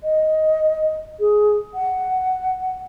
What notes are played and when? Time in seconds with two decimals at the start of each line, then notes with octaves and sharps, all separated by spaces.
0.04 D#5
1.20 G#4
1.74 F#5